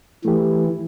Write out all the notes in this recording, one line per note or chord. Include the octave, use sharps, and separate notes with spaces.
E3 A3 G4